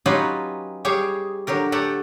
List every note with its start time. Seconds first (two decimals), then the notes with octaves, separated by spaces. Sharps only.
0.06 F#3 C#4 D#4 F4 G4 B4
0.85 G3 G4 G#4 C#5 F5
1.47 D3 F#3 G4 A#4
1.72 A3 G4 A4 F#5